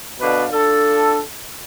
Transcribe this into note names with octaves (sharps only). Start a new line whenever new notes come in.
B2 D3 D4 B4 F5
D4 F4 A4